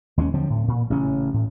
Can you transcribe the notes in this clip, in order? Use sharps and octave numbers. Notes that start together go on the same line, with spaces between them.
D#2 G#3 C4 C#4
D3 F3 F#3 C4
A2
A#2
A1 C#3 C#4
A2